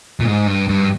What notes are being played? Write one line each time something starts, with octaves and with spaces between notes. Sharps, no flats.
A#2
G#2
G2
G2